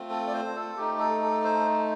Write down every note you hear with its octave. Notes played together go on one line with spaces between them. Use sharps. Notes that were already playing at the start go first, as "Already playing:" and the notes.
Already playing: A3 C4 F4
A4
D5
C5
A4
A3 D#4 G4
A4
A4
C5